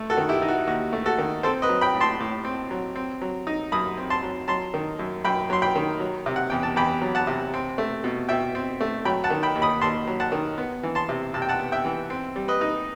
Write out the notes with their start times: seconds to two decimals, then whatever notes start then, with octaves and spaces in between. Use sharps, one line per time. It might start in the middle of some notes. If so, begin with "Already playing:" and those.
Already playing: A3
0.10 F#4 A4
0.17 D#3
0.29 E4 G4
0.42 D#4
0.48 F#4
0.67 D#2 F#4
0.93 A3
1.06 F#4 A4
1.18 D#3
1.43 C4 A4 C5
1.62 B4 D#5
1.69 F#3
1.81 G5 B5
1.95 A2
2.01 A5 C6
2.20 A2
2.45 C4
2.71 F#3
2.96 C4
3.22 F#3
3.47 D#4
3.72 F#2 B5 D#6
3.98 C4
4.10 A5 C6
4.23 F#3
4.48 F#3 A5 C6
4.74 D#3
4.99 F#2
5.24 F#2 G5 B5
5.50 F#3 C6
5.62 G5 B5
5.76 D#3
6.00 F#3
6.26 C3
6.36 F#5
6.50 E2 G5
6.63 A5
6.76 E2 G5 B5
7.02 F#3
7.15 F#5 A5
7.27 C3
7.54 C4
7.78 A3
8.04 B2
8.29 B2 E5 G5
8.55 C4
8.81 A3
9.05 F#3 G5 B5
9.24 F#5 A5
9.30 D#3
9.43 G5 B5
9.56 D#2
9.62 B5 D#6
9.81 D#2 A5 C6
10.07 F#3
10.20 F#5 A5
10.32 D#3
10.58 B3
10.83 E3
10.95 A5 C6
11.09 C3
11.34 C3 A5
11.42 G5
11.49 F#5 A5
11.59 B3
11.72 E5 G5
11.85 E3
12.10 C4
12.36 G3
12.48 B4 D#5
12.61 D#4